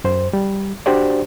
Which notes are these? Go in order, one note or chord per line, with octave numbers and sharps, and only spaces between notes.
F#2 C5
G3
D4 F#4 G4 C5 D5